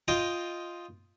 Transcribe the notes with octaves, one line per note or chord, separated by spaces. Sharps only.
F4 D#5 G5